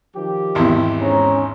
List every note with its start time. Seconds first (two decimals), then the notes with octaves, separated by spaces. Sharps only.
0.16 D#3 F3 G4
0.55 G#1 E2 E4
1.01 G#2 C#4 A#5